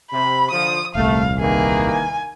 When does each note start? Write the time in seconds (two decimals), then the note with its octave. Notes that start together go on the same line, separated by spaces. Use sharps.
0.11 C3 B5
0.51 D3 F3 D#6
0.95 D#1 C2 A3 F5
1.39 D#3 E3 A#3 G#4
1.91 G#5